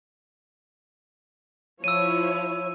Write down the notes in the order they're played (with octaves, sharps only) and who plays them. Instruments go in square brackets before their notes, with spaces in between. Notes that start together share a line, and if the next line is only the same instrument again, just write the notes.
[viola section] F3 E4 C#5 [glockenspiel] E6 D#7